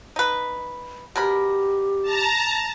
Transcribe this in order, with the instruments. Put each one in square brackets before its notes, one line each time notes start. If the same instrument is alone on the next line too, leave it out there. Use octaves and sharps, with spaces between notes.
[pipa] D#4 B4
[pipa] B2 A#4 B5 [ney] G4
[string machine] A5 A#5